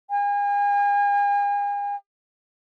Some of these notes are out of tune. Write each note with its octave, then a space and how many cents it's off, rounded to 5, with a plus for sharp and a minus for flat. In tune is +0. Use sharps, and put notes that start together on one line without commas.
G#5 -40